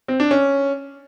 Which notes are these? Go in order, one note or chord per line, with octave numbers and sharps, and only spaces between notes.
C4
D4
C#4